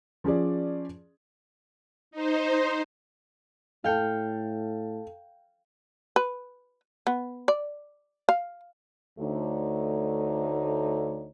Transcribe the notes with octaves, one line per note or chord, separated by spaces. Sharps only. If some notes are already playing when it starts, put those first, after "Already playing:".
F3 C#4 G#4 D5
D#4 C5
A2 A4 F5 G5 A5 C#7
B4
B3
D5
F5
D2 D3 A3 D#4 C#5